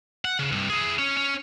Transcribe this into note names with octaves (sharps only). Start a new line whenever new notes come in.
F#5
C#3
C2 G2
E4 G#4
C#4
C#4